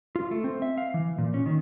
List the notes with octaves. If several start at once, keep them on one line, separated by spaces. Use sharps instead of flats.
F4
A3
C4
E5
F5
E3
A#2
C#4
D#3